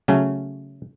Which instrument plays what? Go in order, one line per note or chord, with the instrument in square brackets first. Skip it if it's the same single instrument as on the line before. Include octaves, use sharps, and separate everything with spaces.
[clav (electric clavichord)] C#3 F#3 A3 C#4